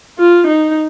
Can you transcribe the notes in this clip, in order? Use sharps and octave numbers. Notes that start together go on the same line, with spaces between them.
F4
D#4